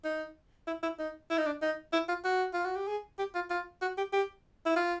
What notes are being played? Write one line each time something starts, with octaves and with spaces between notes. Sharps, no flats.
D#4
E4
E4
D#4
E4
D#4
D4
D#4
E4
F4
F#4
F4
F#4
G4
G#4
G4
F4
F4
F#4
G4
G4
E4
F4